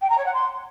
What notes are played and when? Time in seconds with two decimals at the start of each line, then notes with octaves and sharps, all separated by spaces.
0.01 G5
0.09 A#5
0.17 C#5
0.25 F#5
0.34 C6